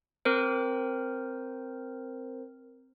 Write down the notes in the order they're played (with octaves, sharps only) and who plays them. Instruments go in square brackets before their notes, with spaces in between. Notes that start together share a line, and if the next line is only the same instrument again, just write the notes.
[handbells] C4 A#4 C5